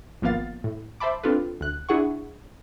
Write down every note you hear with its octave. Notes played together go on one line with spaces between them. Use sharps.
G#1 F3 A#3 B3 F5 A6
A2
C5 E5 A5 B5 D6
C4 D4 F4 A4 B4
D2 F#6
D4 E4 G#4 F#5 C#6